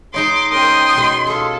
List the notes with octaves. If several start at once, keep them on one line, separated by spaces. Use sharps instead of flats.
G#3 D#4 C#5 C6 D6
C#4 A#4 G5 C6 D#6
B2 G#3
F4 G#4 A4